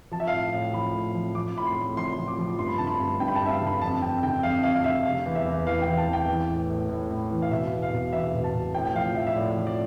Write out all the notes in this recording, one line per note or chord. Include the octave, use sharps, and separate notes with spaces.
F3 A5
E5
F5
A2
A2
F3 B5
A2
F3
F3 D6
A2 B5
C6
A2
F3 C6
F3
D6
F3
G2 C6
B5
D3 A5
B5
G2
G2 G5
B5
A5
G2 E5
F5
D3
B5
F2 A5
F2 G5
D3 G5
F2 F5
F2 F5
F5
D3 E5
C3 F5
E2
E5
E2
E3 F5
G5
E3
A5
E2
G5
E3
A2
A2
A2
A2
E3
F5
B2 E5
E2
F5
B2
E2 E5
B2
A5
B2
A2 G5
G5
F3 F5
F3 E5
E5
A2 D5
F3
D5